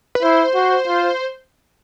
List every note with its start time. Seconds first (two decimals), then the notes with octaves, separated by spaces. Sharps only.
0.15 B4
0.23 E4 C5
0.55 F#4
0.87 F4